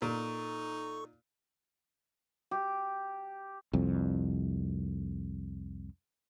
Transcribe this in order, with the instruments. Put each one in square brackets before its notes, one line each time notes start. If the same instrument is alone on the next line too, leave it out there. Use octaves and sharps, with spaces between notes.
[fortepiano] A#2 [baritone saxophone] D#4 [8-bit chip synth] A4 C#6
[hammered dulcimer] G4
[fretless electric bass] C2 F2